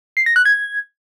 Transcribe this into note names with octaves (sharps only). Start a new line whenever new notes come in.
C7
A#6
F#6
G#6